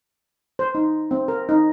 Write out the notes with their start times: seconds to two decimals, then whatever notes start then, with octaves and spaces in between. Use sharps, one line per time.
0.59 C5
0.75 D#4
1.11 C4
1.28 A#4
1.49 D#4